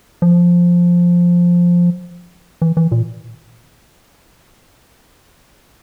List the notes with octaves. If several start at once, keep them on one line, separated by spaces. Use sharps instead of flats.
F3
E3
E3
A#2